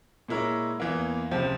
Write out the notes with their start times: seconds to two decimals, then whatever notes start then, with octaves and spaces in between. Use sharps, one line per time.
0.28 A#2 G#3 E4 A#4 C#5
0.80 E2 E3 A#3
1.31 C#2 C3 F3